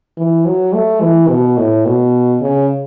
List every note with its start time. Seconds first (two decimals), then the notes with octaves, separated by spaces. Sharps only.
0.17 E3
0.46 F#3
0.74 A3
1.01 E3
1.29 B2
1.57 A2
1.86 B2
2.41 C#3